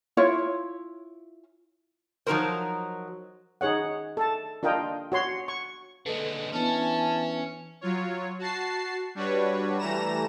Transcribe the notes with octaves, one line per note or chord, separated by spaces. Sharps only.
E4 F4 C#5
F3 F#3 D#4 A4 A#4 C5
D#4 G#4 C#5 F#5
A4 A5
D4 F4 A#4 D#5 G5
F#4 C#5 C6
C#6
D3 G#3 A4 B4
E3 B3 C#4 D4 A5
F#3 F4 C#5
F#4 A5 C7
G3 D4 F#4 B4 C#5
E3 G3 A3 A#5 A#6 E7